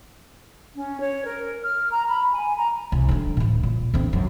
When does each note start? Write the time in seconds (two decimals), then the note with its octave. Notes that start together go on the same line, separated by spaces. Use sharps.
0.75 C#4
0.99 C#5
1.23 A#4
1.63 F6
1.90 A#5
2.07 B5
2.33 G#5
2.56 A#5
2.92 C2
3.09 D3 G3
3.37 D2 A2
3.63 A#2
3.94 D3 C4
4.13 F#2